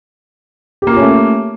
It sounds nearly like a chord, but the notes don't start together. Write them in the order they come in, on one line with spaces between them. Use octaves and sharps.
G4 A#3 F4 C#4 A3